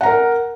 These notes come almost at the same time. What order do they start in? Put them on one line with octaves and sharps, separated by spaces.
F#5 A#5 A#4